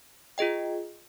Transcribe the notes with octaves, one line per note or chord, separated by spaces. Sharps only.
F4 G#4 D#5 G5